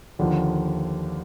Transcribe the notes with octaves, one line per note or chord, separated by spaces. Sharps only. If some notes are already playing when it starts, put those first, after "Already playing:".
D#2 D3 F3